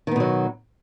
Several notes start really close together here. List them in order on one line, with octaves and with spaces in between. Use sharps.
D#3 B3 B2 F#3